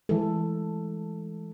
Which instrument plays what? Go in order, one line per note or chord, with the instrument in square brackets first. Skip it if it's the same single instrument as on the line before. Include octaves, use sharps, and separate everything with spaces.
[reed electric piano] E3 G#3 [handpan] A4